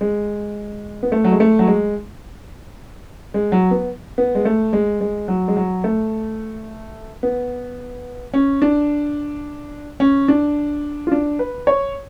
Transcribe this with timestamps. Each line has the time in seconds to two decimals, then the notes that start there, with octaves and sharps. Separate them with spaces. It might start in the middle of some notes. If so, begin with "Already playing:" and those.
0.01 G#3
1.03 B3
1.12 A3
1.24 F#3
1.32 G#3
1.40 A3
1.59 F#3
1.68 G#3
3.34 G#3
3.52 F#3
3.71 B3
4.18 B3
4.35 G#3
4.45 A3
4.73 G#3
5.01 G#3
5.28 F#3
5.48 G#3
5.57 F#3
5.84 A3
7.23 B3
8.34 C#4
8.62 D4
10.00 C#4
10.28 D4
11.07 F4
11.12 D4
11.39 B4
11.67 C#5